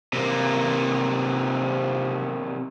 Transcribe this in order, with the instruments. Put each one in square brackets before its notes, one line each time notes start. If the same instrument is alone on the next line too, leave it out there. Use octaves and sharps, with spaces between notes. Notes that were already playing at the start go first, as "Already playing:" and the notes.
[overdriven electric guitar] C3 A#3